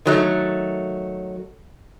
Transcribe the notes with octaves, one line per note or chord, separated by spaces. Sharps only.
D#3 F#3 A3